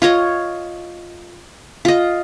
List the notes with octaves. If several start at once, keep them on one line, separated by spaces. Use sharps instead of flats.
F4 C#5 D#5
F4 D#5